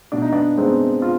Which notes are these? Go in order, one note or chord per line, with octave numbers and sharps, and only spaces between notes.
B2 D4
D#4
B3 D4
G#3 B3 C4 D#4
F4